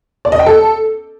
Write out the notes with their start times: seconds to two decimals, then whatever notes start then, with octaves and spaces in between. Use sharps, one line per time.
0.25 D5
0.32 D#5
0.39 G5
0.46 A4